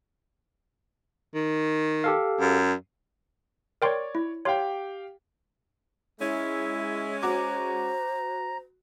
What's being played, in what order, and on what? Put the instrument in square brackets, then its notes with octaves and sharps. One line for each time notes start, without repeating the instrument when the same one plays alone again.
[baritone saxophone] D#3
[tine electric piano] G4 A4 F5
[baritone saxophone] F#2
[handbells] A#4 G5 C6 [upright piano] C#5 D5
[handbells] E4
[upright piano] G4 F5 G5 [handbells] C#5 C6
[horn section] G#3 C#4 [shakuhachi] E4 [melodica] E5
[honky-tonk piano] F#4 D6 [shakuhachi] C5 [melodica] A#5